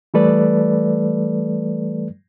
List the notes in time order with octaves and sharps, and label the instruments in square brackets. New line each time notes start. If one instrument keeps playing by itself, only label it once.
[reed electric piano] E3 G3 A3 A4 B4 D5